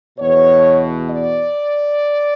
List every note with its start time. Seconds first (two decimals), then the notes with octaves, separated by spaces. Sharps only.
0.19 E2 B2 C#5
1.11 D5